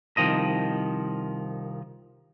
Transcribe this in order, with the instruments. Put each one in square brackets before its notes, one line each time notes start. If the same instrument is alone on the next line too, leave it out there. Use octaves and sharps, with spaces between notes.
[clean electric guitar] C2 D#3 F3 D#5